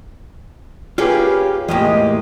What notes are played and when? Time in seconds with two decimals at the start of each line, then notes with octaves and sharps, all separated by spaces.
0.98 A#3 C#4 F4 G4 G#4 B4
1.69 E2 A2 G#3 A#3 G4 D#5